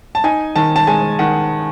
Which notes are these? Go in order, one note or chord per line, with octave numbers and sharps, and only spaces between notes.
A5
D#4 G#5
D#3 A5
A5
G#3 G#5
D#3 F#5